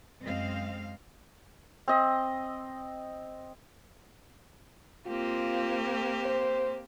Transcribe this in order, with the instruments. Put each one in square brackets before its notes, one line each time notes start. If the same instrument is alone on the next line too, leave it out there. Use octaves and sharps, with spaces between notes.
[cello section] F#2 G#3 C4 C5 D#5 F5
[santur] C4 D#5
[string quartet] A#3 C4 G4 [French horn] F4
[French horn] C5